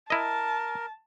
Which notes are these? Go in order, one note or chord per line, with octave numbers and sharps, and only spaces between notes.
E4 A#4 D#5 A5